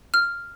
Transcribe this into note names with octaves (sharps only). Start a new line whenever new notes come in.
F6